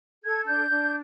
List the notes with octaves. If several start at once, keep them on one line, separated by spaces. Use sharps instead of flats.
A4 G#6
D4 G6
D4